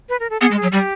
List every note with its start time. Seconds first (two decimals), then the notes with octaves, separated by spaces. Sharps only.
0.09 B4
0.20 A#4
0.30 A4
0.41 B3 G#4
0.51 G#3
0.57 G#4
0.62 F#3
0.72 G3 G4